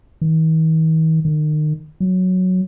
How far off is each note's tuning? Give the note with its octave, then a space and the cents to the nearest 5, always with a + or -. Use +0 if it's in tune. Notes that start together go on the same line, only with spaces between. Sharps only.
D#3 +45
D#3 -35
F#3 -5